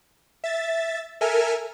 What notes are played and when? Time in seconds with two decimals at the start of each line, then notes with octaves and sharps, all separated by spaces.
0.44 E5 A6
1.21 A4 A#4 E5 G#5 F6